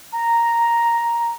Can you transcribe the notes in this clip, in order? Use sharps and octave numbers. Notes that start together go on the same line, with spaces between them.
A#5